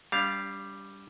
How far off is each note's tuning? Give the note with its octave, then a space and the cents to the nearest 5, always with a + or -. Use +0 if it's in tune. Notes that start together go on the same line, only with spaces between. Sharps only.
G3 +0 D4 -40 F5 +0